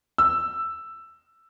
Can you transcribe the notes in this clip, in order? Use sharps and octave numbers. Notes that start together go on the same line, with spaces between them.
E6